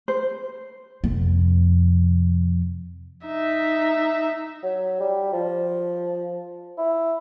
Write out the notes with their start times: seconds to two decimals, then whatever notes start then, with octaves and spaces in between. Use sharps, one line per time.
0.08 C5
1.04 F2 C3
3.26 D#4 E5
4.63 F#3
5.00 G3
5.33 F3
6.78 E4